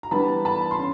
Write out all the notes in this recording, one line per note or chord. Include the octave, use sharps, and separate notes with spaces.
A#5
E3 G3 B3 D4 A5 B5
A5 B5
C6
C#4